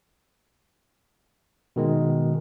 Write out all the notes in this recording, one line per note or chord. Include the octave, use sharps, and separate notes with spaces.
B2 D#3 G#3